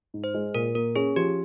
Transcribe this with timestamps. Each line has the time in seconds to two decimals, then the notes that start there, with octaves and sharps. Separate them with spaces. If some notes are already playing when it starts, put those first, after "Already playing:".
0.14 G#2
0.24 C5
0.34 G#3
0.55 A#2 A#4
0.75 A#3 A#4
0.96 C#4 G#4
1.16 F3 G4